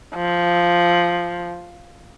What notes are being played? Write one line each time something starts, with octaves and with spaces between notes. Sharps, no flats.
F3